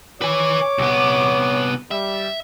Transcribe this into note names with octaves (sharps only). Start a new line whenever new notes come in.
B4 C#5 G#5 D6
C2 B3
G3 E5